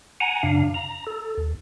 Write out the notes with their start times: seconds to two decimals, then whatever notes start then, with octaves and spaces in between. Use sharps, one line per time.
0.20 F#5 G#5 A#5
0.43 F#2 C#3 D4 F5
0.74 A#5
1.07 A4
1.38 D#2